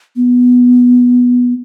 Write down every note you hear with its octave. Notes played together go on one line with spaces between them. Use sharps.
B3